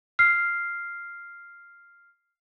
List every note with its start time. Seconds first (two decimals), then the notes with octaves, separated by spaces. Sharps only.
0.19 F6 C7